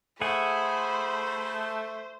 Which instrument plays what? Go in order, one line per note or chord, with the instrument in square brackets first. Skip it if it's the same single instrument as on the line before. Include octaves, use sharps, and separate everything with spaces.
[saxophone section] A3 [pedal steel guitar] G#4 F#5 G#5 [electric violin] C5 [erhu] B5